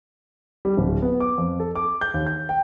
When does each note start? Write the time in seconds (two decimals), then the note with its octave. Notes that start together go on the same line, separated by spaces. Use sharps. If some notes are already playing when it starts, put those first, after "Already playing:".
0.65 G3
0.77 D1
1.02 B3
1.20 D6
1.38 F2
1.60 A4
1.75 D6
2.01 G6
2.14 D#2
2.26 G6
2.49 G5